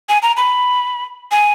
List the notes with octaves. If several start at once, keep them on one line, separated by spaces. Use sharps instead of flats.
G#5
A#5
B5
G#5